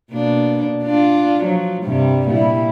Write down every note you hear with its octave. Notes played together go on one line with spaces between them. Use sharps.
B2 A#3 D4
D4 F4
F3 F#3
G2 C3 G3
A#2 G3 E4